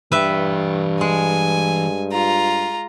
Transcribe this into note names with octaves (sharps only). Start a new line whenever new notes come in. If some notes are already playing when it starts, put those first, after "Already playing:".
G2 E3 B4 E5 G5
G#3 G#5
F4 A#5